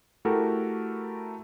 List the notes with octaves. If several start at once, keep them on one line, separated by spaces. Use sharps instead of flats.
A3 E4 F#4 G4 A4 A#4